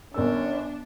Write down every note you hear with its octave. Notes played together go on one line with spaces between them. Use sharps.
G1 C#4 D4 A#4 E6